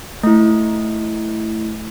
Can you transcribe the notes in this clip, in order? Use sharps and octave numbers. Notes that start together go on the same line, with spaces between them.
A3 E4